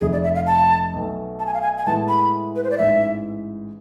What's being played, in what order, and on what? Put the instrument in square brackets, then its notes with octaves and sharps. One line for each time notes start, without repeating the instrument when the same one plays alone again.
[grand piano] F1 F2 C3 [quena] G#4
[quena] D5
E5
F5
A5
[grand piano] B1 B2 A3
[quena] A5
G#5
F5
G#5
G#5
[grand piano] A2 E3 G#3 B3 E4 [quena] A5
[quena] B5
B4
C5
D5
[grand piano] A1 G#2 E3 [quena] E5